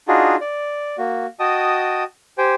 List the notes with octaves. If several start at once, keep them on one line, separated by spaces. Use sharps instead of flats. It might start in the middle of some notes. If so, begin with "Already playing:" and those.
D4 D#4 F4 F#4 G#4
D5
A#3 F#4
F#4 D#5 G5 A5 D#6
G4 C5 G5 G#5